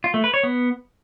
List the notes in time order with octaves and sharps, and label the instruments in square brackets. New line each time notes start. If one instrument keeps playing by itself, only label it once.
[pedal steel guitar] F4
A3
B4
C#5
B3